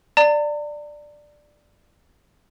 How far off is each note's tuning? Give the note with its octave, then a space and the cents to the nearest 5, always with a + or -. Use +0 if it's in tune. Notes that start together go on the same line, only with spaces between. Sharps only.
D5 +10 A#5 -40